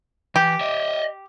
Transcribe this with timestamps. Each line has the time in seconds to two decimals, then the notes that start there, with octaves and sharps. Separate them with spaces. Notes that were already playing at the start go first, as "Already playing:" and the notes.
0.36 E3 G4
0.61 D#5 E5